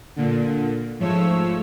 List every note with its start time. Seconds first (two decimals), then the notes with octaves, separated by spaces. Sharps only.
0.16 A#2 D3
0.99 G#2 F3 A3 C#5 E6